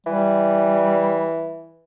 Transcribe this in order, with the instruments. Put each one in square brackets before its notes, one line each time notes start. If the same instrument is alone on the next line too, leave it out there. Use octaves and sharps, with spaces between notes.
[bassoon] E3 [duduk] G3